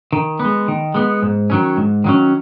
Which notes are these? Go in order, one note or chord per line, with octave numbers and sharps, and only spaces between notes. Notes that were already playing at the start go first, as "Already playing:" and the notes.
D#3
B3
G#3
D#3
G#3 B3
G#2
D#3 F#3 C#4
G#2
D#3 F#3 C#4